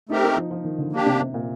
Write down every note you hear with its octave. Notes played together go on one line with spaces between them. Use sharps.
A3 C4 D#4 G4 A#4
D#4
F3
F3
D#3
D3
A#3 D4 G4
C3
C3
A#2